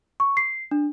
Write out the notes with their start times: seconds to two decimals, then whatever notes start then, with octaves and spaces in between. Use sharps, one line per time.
0.20 C#6
0.37 C7
0.71 D4